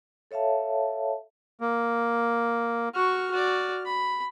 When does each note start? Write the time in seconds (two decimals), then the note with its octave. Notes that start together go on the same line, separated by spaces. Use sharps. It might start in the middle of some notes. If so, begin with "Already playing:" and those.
0.31 A4 C#5 E5 F5 A5
1.61 A#3
2.94 F#4 C#6 F6
3.31 F#4 D5
3.85 B5